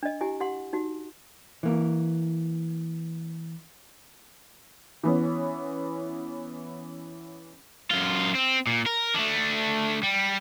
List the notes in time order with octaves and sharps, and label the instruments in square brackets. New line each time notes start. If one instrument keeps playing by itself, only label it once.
[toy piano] D4 D#5
E4 G4 G#5
G4 F#5 C6
D#4 F#4
[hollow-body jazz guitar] E3 A#3
[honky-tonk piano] E3 B3 C#4
[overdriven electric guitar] F#2 F4
C4
A#2
A#4
A3 D4
G3